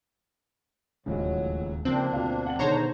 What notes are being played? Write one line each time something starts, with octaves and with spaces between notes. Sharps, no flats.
D1 D#2 A2 C#3 F3 F#3 G#3
C#3 F3 A#3 C4 D4 F#7
D2 B2 F4 F5
F#5 A5 F#7
B2 D3 D#3 G#4 C5 C#5 A#5